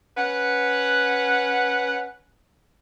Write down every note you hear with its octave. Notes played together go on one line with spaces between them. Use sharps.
C#4 B4 F#5